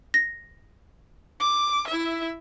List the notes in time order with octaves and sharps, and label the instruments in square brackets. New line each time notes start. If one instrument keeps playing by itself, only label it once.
[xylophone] A#6
[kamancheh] D6
E4 E5